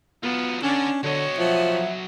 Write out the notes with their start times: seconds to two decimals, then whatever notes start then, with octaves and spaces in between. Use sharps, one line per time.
0.23 F#3 B3 F4
0.63 C#4 D4 A4 F#5
1.03 D3 F#3 C#5 D#5
1.38 F3 E5 F#5